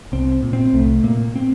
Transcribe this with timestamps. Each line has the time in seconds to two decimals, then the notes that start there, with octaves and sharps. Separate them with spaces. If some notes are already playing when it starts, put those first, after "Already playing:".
0.12 C2 C4
0.43 A#2
0.53 C4
0.73 C2 A3
1.03 A#2 A#3
1.35 C4